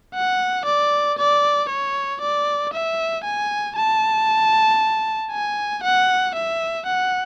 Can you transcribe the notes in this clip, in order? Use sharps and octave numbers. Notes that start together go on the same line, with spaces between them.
F#5
D5
D5
C#5
D5
E5
G#5
A5
G#5
F#5
E5
F#5